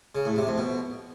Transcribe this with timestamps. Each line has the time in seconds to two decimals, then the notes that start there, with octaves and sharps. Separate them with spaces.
0.15 C#3
0.25 A2
0.36 C3
0.47 F2
0.58 B2